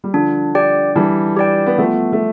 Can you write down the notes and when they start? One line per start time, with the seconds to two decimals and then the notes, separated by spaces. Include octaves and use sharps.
0.04 G3
0.14 D3 F3 D4
0.55 G4 D5 G5
0.96 E3 G3 D4
1.37 G4 D5 G5
1.66 B3
1.78 F3 A3 B3
2.13 A3